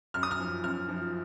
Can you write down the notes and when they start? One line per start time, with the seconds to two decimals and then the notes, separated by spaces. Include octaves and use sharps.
0.14 F#2 F6
0.23 D#6
0.31 F6
0.40 F3
0.64 F#2 F6
0.89 F3